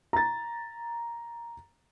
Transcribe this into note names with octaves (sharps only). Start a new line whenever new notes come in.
A#5 A6